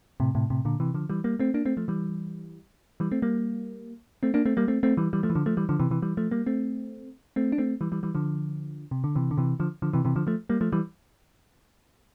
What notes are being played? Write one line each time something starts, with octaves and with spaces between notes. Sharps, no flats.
A2 C3
A2 C3
A2 C3
A#2 D3
C3 E3
D3 F3
E3 G3
G3 A#3
A3 C4
A#3 D4
A3 C4
F3 A3
E3 G3
E3 G3
A3 C4
G3 A#3
A3 C4
A#3 D4
A3 C4
G3 A#3
A3 C4
A3 C4
E3 G3
E3 G3
F3 A3
E3
D3 F3
F3 A3
E3 G3
D3 F3
C3 E3
C3 E3
E3 G3
F3 A3
G3 A#3
A3 C4
A3 C4
D4
A3 C4
E3 G3
E3 G3
E3 G3
D3 F3
C3
D3
C3 E3
D3
C3 E3
D3 F3
D3 F3
C3 E3
C3 E3
D3 F3
F3 A3
G3 A#3
F3 A3
E3 G3